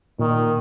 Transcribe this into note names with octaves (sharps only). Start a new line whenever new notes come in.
A#2 D#3